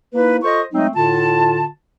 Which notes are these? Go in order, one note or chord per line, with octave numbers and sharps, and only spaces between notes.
A#3 D#4 E4 B4
F4 A4 C5 D#5 C#6
F#3 G#3 A3 C4 D#4
A2 D3 F4 A5